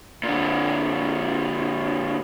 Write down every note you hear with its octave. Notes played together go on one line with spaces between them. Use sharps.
A#2 D3